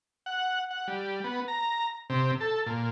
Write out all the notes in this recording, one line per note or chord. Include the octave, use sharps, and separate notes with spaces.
F#5
F#5
G3
B3
A#5
C3
A4
A#2